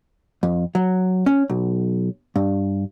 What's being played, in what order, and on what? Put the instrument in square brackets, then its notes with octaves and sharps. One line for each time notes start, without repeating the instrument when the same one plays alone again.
[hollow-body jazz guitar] F2
F#3
C#4
B1
G2